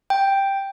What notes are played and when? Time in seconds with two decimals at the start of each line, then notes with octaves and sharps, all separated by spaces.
0.10 G5